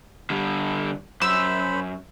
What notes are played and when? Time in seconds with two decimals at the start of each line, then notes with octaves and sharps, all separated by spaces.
0.30 D3 G3
1.22 F#2 C5 B5 E6